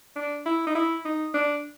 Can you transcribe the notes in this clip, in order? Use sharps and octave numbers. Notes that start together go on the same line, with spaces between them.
D4
E4
D#4
E4
D#4
D4